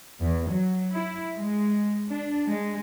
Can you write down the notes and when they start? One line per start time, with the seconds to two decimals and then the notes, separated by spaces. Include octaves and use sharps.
0.21 E2
0.49 F#3
0.93 E4
1.38 G#3
2.09 D4
2.48 G#3